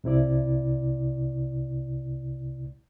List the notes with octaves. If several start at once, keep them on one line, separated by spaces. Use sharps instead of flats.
C2 C3 E4 D5